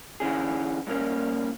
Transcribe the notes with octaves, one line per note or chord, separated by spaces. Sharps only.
D3 E3 C#4 G#4
G2 A#2 A#3 C#4